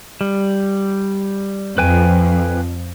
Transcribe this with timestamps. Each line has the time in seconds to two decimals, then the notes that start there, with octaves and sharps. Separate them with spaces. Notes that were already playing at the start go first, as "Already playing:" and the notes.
0.21 G3
1.78 F2 B4 G5 G#5